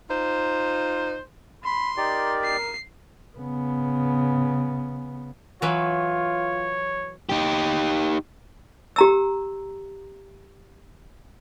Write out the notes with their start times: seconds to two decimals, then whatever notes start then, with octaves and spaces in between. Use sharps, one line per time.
0.10 D#4 F4 C5
1.65 B5 C6
1.97 D#4 G4 A#4 D5
2.44 C7
3.36 C#3 B3
5.62 E3 F#3 F4 B4 C#5
7.29 D#4 G4
8.96 G4 A#5 E6